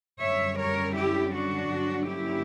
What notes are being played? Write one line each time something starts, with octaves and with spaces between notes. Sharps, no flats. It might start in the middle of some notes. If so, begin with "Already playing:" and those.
F#2 D3 G3 C#4 C#5 E5
A#4 C#5
E4 G4
D4 F#4
G2 D3 F#3 A#3 C#4
E4 G4